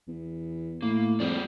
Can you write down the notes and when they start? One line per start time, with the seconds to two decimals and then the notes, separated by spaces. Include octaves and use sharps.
0.08 E2
0.82 A2 A#3
1.20 F2 G3 G#4 D5